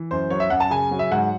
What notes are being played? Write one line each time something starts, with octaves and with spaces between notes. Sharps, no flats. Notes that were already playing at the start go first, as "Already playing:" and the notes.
Already playing: E3
F#2 C5
F#3 C#5
E5
F#2 F#5
A5
C#3 G#5
F#3
E5
G#2 F#5